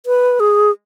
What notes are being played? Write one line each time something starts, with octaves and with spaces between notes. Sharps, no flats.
B4
G#4